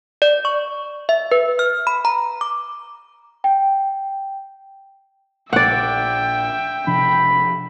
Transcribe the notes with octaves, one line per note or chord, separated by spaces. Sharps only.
D5
C#6
E5
B4
F6
B5
A#5
D6
G5
A#1 D5 E5 F#5 G5
C3 F3 D4 B5